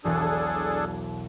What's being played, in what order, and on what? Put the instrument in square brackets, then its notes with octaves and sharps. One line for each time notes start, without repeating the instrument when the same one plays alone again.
[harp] E1 B1 [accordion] D4 G#4 A4